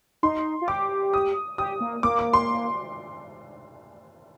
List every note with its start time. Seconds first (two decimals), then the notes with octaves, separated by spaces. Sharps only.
0.23 D#4 C6
0.62 F4
0.68 G4 D6
1.14 D#6
1.58 G4 D#6
1.81 A#3
2.03 A#3 D6
2.19 D6
2.33 C6